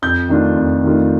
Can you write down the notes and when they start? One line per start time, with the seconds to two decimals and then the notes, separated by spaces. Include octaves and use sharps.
0.02 F2 G6
0.29 D#3 A3 D4 F4
0.56 F2
0.84 D#3 A3 D4 F4